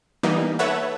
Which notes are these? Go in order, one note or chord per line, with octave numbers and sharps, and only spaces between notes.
E3 G3 A#3 B3 D#4
A4 B4 C#5 E5 F#5